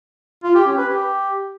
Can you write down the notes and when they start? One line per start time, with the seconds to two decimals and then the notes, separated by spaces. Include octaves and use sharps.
0.43 F4
0.55 G4
0.66 C#4
0.77 B4
0.89 G4